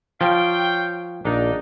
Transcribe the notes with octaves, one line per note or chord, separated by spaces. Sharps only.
F3 C#5 F5 G5
A#1 D4 D#4